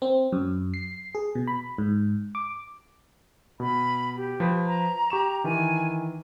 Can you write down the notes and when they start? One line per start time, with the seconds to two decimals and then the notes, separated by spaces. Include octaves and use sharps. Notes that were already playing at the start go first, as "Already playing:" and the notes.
0.02 C4
0.32 F#2
0.74 C7
1.15 G#4
1.35 B2
1.47 B5
1.78 G#2
2.35 D6
3.60 B2 B5
4.16 G4
4.40 F3 B4 B5
4.66 A#5
5.10 G4 C#6 E7
5.44 D#3 E3 G#5